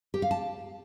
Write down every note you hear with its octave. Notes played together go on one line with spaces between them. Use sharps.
G4
F5
A5